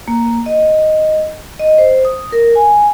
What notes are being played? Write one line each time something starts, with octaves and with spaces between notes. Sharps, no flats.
A#3
D#5
D#5
C5
D#6
A#4
G#5